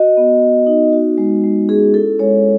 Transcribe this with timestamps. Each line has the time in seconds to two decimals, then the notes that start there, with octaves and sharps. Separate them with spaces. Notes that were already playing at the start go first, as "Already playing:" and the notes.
Already playing: F#4 D#5
0.17 B3
0.42 B3
0.67 D#4
0.93 F#4
1.18 G#3
1.44 G#3
1.69 C#4 G#4
1.94 E4 A4
2.19 G#3 C#5